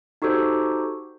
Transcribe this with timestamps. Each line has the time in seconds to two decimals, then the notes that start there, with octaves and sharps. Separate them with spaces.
0.22 D#4 F#4 G4 A4 C5